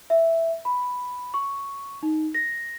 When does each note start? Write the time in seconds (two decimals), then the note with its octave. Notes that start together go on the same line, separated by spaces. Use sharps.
0.10 E5
0.65 B5
1.34 C#6
2.03 D#4
2.34 A#6